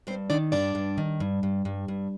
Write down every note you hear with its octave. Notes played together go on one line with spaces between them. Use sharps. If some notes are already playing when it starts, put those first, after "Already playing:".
G2 C4 C5
D#3 D4 D5
G2 D4 D5
G2
D#3
G2
G2
G2
G2